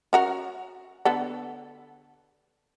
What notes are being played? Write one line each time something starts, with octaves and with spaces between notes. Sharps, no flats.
C#4 F#4 A#4
D3 B3 A4